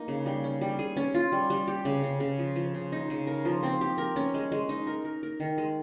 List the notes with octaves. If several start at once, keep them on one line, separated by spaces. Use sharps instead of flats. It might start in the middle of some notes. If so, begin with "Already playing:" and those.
Already playing: A#3 D#4
C#3
G3
C#4
G3
G#4
C#4
F4
G3
G3
G4
C#3
C#3
C#3
F3
F3
C#3
D#4
C#3
A#4
F3
C4
G4
A#4
C#4
G#3
G#3
D#4
A#4
A#4
A#4
D#3
G#3